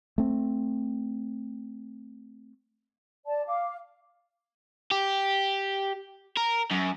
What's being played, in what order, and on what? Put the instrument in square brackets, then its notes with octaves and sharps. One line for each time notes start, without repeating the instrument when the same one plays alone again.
[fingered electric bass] A3 C4
[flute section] D5 A5
F5 D6
[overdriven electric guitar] G4
A#4
F#2